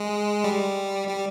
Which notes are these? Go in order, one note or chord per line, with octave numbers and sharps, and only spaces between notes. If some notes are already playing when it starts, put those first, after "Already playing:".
Already playing: G#3
G3
G3